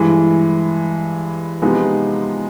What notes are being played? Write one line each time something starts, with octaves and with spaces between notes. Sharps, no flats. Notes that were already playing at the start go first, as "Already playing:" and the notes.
Already playing: G2 E3 G#3
C3 F3 G#3 B3 D#4